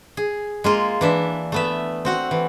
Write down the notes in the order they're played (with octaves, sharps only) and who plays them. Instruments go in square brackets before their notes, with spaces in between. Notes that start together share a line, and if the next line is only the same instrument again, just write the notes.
[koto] G#4
G#3 A#3 F4
E3 D4 E5
A3 B3 E5
C4 F#4 F#5
E3